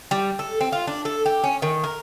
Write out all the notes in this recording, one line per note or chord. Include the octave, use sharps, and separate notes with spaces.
G3
A4
C4
F4
D4
A4
G4
C#4
D#3
A#4